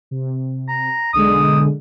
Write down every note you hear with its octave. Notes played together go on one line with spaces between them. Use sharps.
C3
A#5
B1 D3 G#3 D#6